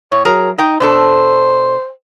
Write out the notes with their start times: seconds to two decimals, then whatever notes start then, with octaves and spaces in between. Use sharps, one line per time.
0.12 A2 C#5
0.25 F#3 G#4 A#4 A#5
0.58 D#4 D#5 G5
0.80 B2 D4 A4 C5